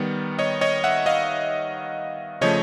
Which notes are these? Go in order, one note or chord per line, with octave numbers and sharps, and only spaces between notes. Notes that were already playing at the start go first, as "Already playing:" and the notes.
Already playing: D#3 G3 B3
C#5 D#5
C#5 D#5
E5 F#5
D#5 F5
C#3 F3 A3 C#5 D#5